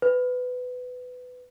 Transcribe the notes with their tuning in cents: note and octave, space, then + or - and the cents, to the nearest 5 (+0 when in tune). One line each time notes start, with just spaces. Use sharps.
B4 +20